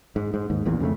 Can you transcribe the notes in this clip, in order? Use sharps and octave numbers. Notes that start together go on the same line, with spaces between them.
G#2
G#2
D#2 G#2
A1 E2 A#2
F2 C#3 G3 A3